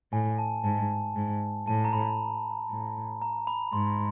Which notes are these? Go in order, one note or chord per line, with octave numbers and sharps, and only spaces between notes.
A2 G#5
A5
G#2 A5
G#2
A2 A5
A#5
B5
A2
A#5
B5
G#2 C6